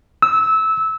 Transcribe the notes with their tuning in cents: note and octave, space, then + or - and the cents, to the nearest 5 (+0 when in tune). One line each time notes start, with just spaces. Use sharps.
E6 -20